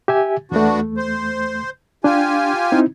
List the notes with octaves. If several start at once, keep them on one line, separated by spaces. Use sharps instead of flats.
G4 E5 G#5
E2 A3 B3 D4 F#4
C5
D4 F4 G4 G#5
C4 D#4 E4